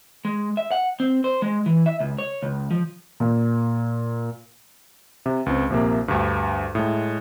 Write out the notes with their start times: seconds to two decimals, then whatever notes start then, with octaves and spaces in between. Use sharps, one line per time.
0.25 G#3
0.57 E5
0.71 F#5
1.00 C4
1.24 C5
1.42 G#3
1.66 E3
1.86 E5
2.00 C#2
2.18 C#5
2.43 C#2
2.71 F3
3.20 A#2
5.26 C3
5.46 C#2 C4
5.70 A#1 C3 A#3
6.08 D2 G2
6.75 A2 G#3